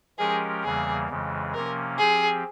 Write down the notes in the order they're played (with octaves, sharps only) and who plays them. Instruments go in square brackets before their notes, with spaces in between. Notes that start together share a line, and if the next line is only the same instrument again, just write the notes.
[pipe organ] F3 G#3 C#4 G4 A#4 [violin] G#4
[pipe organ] E2 C#3 E3 G3 A#3 [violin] G#4
[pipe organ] F2 C#3 E3 G#3
[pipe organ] C3 F3 A#3 C#4 [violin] A#4
[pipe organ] F3 C4 G4 [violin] G#4